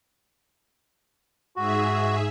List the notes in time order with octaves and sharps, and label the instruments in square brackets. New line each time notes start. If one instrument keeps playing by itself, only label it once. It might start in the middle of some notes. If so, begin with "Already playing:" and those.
[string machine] G#2 G#4 E5 [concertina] F#4